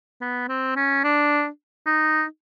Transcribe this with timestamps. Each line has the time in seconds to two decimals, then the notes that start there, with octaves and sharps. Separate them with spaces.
0.21 B3
0.49 C4
0.76 C#4
1.04 D4
1.87 D#4